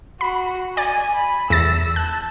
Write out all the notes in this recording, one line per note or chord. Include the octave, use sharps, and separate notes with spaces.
F#4 B5
D5 G#5
B5
E2 E6 A6
A5 F#6